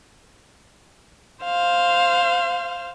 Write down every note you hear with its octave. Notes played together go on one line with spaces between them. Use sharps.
C5 F5